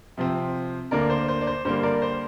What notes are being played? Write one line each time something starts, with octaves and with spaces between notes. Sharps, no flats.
C3 F3 C4
D2 D3 A#3 D4 A#4 D5
C5
C5
D5
C5
G2 D3 G3 A#3 C5
A#4 D5
C5